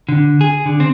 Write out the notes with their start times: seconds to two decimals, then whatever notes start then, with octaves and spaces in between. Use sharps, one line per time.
0.09 D3
0.41 G#4
0.66 D3
0.80 C4